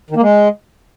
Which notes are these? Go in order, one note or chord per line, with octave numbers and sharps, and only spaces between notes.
D#3
A#3
G#3